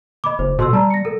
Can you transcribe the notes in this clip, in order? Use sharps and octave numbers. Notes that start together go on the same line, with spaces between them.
D#5 B5 D6
F#1 C5
B2 A4 C6 E6
G3 A5 A#5
A#6 C#7
A4 A#4